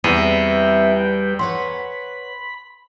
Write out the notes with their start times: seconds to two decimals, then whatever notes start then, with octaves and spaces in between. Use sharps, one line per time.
0.04 E2 G3 C4 E4 B4 G5 D#7
1.39 B4 C#5 F#5 B5 C6